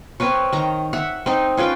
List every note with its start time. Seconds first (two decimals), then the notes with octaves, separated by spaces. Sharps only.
0.20 C4 A#4 B4 C#5
0.53 D#3 A#5
0.93 E5 F#5
1.26 C4 D#4
1.57 C#4 F4 B4 G5